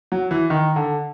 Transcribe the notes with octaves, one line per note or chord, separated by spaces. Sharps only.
F#3
E3
D#3
D3